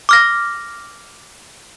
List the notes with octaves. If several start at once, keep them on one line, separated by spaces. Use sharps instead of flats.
D6 F6 A#6